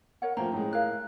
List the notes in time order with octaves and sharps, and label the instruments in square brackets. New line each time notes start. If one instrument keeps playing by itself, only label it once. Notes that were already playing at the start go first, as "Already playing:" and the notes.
[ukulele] A#4 C#5 F#5
[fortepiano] F3 A3 A#3 [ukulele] C5 G5 [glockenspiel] A#5
[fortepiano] A2 G#3
[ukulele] E4 A#4 F5 [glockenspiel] F#6